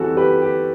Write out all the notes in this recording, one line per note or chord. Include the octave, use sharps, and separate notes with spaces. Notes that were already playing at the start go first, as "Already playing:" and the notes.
Already playing: E3 G3 C4 F#4 A4
G4 B4
G4